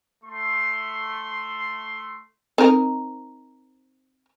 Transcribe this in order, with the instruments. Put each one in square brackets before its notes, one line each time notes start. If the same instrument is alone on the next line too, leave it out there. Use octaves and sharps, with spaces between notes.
[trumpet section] A3 C6
[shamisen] C4 D#4 A#4